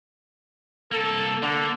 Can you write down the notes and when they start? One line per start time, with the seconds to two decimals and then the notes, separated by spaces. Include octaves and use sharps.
0.92 C2 A#3 A4
1.42 D3 A#3 A4